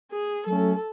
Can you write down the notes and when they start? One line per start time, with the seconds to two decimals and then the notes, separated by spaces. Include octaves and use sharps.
0.11 G#4
0.47 F#3 A3 C#4 A4